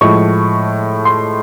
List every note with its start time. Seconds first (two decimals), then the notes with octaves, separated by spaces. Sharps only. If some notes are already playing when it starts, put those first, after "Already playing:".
0.01 A2 F3 G#3 C#6
1.05 C6